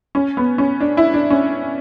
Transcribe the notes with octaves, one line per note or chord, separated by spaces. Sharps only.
C#4
B3
C#4
D4
E4
D4
C#4